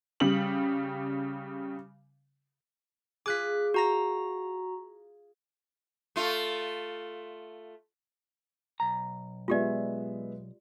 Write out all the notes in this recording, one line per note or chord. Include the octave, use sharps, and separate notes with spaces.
C#3 G3 F#7
F4 G#4 D6 F#6 B6
F#4 A#5 A#6
A3 F4
B1 A#5
G#3 B3 F4 G4 D5 E5